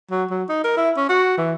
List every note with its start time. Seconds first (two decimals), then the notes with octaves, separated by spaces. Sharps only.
0.11 F#3
0.30 F#3
0.49 D#4
0.64 A#4
0.77 E4
0.97 C#4
1.09 F#4
1.38 E3